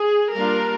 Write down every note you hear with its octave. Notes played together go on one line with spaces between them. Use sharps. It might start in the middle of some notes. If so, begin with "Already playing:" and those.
Already playing: G#4
G3 A#3 D4 F4 A#4